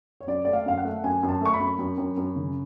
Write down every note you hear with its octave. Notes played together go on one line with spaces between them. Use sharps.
C#5
F#2 D5
A3 D5
F5
F#2 F5
F#5
A3
F#2 G#5
F#2
A5
A3 C#6
B5
F#2
F#2
F#2
F#2
C#3